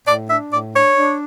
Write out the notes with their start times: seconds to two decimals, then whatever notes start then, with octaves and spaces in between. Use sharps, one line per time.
0.07 A2 D5
0.29 D4 E5
0.52 A2 D5
0.74 D4 C#5
0.97 D4